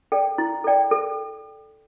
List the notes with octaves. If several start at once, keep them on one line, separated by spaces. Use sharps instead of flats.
A4 D5 G5
E4
A4 D5 G5
A4